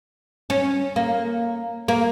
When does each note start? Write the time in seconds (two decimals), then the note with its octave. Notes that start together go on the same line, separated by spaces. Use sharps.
0.50 C#4
0.96 A#3
1.88 A#3